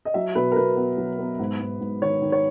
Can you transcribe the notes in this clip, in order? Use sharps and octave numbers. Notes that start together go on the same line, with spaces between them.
D#5
F#3 E5
B2 B4
A#4
B2 B4
B3
F#3
B3
G#2
G#2
G#2
D#3 C#5
D#3
C#5